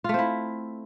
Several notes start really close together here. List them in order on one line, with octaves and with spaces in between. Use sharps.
F4 A3 C4 E4